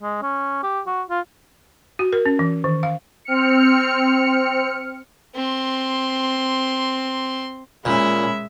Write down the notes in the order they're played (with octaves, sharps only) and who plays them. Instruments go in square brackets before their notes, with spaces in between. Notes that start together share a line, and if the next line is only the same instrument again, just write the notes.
[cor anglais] G#3
C#4
G4
F#4
F4
[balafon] F#4
A#4
C#4
E3
D#3
F5
[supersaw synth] C4 F6 C#7
[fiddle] C4 C6
[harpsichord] A#2 [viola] G#3 E5 [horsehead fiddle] C#4 B5